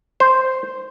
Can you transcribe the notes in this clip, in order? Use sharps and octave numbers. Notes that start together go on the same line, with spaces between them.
C5